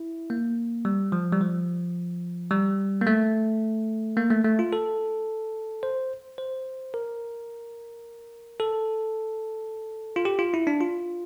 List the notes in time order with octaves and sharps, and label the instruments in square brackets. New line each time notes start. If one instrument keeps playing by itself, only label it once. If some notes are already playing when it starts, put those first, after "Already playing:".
Already playing: [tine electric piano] E4
A#3
G3
F3
G3
F3
G3
A#3
A3
A#3
A3
A3
F4
A4
C5
C5
A#4
A4
F4
G4
F4
E4
D4
F4